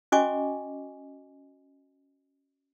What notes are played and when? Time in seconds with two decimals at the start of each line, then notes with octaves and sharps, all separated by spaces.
0.12 C#4 F#4 D#5 G#5 C#6 D6